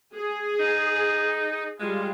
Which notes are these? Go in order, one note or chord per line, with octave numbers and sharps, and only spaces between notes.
G#4
D#4
G3 G#3 F4